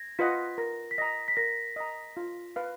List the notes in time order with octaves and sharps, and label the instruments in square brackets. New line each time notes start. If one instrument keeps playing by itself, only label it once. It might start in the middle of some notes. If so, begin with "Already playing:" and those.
Already playing: [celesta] G#6 A#6
[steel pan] F4 B4 D#5 F#5 [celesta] B6
[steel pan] A#4 [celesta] A#6
[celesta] B6
[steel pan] D#5 A#5 [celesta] A#6
[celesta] B6
[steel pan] A#4 [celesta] A#6
[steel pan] D#5 A#5
F4
B4 F5